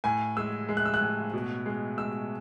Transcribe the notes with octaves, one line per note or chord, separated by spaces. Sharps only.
A2 G#5
G#3 E6
G#3
F#6
E6
F#6
A2
B2
G#3
G#3 E6